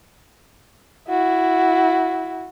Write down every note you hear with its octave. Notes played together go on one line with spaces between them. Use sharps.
E4 F#4